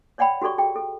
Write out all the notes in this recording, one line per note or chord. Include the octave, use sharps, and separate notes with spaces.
C#5 D5 F#5 G5 B5
F#4 G4 A4 D5 C#6
G#4 G5
A4